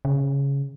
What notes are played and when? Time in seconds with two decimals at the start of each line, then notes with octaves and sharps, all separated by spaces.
0.05 C#3